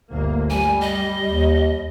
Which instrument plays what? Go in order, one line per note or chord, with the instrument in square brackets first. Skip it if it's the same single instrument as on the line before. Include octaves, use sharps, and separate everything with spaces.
[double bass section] G1 D2 A#3
[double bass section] G3 [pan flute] G#5
[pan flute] D#5
[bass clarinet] D#2